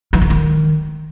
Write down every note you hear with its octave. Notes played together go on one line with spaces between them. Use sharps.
E3
D3
D#3